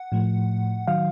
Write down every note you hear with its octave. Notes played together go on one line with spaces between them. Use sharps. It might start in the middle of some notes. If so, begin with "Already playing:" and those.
Already playing: F#5
A2 F3 A3
D#3 F#3 F5